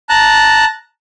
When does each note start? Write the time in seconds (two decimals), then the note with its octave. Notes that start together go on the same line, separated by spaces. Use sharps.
0.09 A5 A#5 F#6